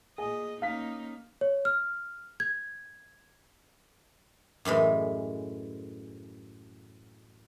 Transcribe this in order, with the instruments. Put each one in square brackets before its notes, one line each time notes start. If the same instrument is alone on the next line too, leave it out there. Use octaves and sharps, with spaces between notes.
[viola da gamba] A#2 D#5 [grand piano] G#4
[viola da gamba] A#3 C#4 D#4 [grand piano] F5 B6
[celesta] C#5
F6
G#6
[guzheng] F#2 A2 E3 G#3